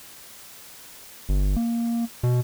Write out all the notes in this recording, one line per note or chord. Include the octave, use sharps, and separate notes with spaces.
G1
A#3
B2